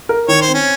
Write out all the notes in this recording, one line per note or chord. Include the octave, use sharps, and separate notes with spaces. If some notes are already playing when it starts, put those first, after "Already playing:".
A#4
D#3 C#5
C5
C4
C#4